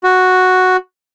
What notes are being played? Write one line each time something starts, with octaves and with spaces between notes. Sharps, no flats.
F#4